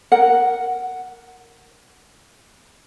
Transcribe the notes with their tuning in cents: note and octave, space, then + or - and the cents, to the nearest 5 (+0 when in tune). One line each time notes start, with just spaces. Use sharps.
A#4 +0 F#5 +0